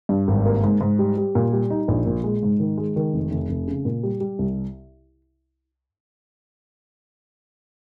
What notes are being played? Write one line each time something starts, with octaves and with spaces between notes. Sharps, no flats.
G2
G#1
A#3
G#2
G#2
G3
G3
A#2
G3
D#4
A#1
A#2
G#3
G#2
D#3
G#3
D#3
F1
F1
F1
C#3
A#2
G3
G3
C2